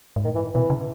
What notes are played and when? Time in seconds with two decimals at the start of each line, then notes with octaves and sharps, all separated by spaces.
0.16 G#2
0.25 A2 D#3
0.35 E3
0.54 B2 E3
0.70 C#3